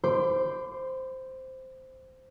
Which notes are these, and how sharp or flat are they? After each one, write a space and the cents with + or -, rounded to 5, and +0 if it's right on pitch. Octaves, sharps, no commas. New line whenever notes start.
C5 +0 B5 +35 D6 +0